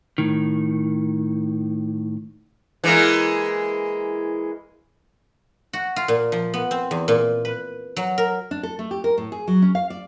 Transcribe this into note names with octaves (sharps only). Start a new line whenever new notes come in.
A2 D#3
E3 G#3 A#3
F#4
F4
A#2
F3
B3
C4
E2
A#2
B4
F#3
A#4
D4
A4
A3
G4
A#4
A2
G#4
F#3
C#4
F5
D5